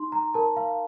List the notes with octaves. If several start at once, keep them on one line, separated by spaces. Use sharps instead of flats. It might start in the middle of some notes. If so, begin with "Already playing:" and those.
Already playing: D#4 C6
A#5
A#4 A5
F5